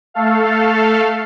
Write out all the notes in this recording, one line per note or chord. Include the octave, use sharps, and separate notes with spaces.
A3 A4 F5